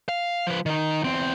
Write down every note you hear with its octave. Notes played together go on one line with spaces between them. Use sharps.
F5
F3 B4
D#3 D#4
E2 C4